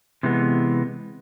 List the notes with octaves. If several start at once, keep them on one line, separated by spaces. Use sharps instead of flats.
C3 E3 G#3 B3